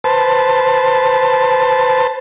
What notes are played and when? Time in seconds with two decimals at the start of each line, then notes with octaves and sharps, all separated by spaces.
0.04 B4 C5 A5